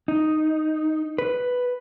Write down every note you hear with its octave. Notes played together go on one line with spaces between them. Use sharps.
D#4
B4